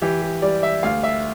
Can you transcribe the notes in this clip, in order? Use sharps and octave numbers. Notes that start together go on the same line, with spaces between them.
E3 G4
G4
G3 D5
E5
D2 F5
E5